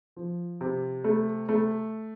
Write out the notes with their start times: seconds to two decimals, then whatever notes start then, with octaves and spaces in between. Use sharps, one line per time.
0.16 F3
0.61 C3
1.04 A3
1.49 A3